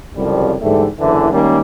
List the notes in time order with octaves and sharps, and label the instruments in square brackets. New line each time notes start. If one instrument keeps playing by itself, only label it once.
[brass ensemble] C2 F2 C#3 F#3 G3
G#2 D3 E3 G3 A3
F#1 D3 E3
D#3 G3 G#3 A#3 C#4